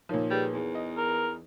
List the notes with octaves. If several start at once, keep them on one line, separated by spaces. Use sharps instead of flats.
A#2 F3 D#4 A#4 C#5
G3 G#4 B4
E2
D#5
A#4